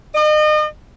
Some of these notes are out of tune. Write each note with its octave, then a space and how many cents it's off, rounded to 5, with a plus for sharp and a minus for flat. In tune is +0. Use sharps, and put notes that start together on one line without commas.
D#5 -35